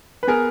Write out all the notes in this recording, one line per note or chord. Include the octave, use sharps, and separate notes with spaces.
B4
B3 G#4 A#4